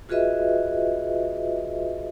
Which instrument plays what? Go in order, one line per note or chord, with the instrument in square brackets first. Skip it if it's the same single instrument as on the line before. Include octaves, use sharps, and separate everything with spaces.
[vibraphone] F4 F#4 G#4 B4 D#5 E5